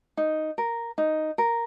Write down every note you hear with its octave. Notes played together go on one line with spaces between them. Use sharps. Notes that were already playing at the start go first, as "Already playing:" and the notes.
D#4
A#4
D#4
A#4